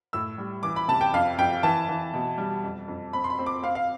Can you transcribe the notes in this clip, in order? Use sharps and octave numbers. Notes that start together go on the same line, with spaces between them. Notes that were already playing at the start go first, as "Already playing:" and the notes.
A2 E6
G3
E3 D6
B5
C3 A5
G5
F2 F5
F2 G5
E3 A5
E3
B2
G3
F2
F2
C4 B5
C6
B5
C4
D6
C4 F5
F5